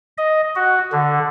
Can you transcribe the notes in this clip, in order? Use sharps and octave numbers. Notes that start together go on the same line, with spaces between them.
D#5
F#4
D3